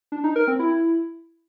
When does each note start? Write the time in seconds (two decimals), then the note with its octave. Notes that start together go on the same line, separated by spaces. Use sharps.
0.12 D4
0.24 D#4
0.36 A#4
0.47 C4
0.59 E4